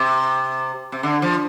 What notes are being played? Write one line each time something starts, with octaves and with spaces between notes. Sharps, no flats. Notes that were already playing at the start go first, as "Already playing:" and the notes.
Already playing: C3
C3
D3
F3